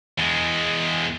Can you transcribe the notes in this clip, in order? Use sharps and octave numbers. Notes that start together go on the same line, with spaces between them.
E2 G#3